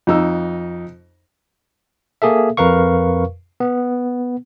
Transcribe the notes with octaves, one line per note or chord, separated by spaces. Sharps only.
F2 D#4 E6
A#3 G#4 A4 E5
F2 A#4 B4 F5 C#6
B3